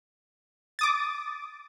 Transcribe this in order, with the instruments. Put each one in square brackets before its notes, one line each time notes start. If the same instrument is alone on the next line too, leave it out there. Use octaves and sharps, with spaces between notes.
[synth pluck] D6 D#6 A6